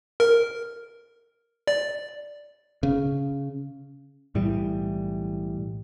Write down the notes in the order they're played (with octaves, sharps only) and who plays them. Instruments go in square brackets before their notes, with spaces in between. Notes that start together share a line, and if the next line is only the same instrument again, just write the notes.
[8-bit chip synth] A#4
D5
[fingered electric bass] C#3
[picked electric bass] B1 A2 E3 G3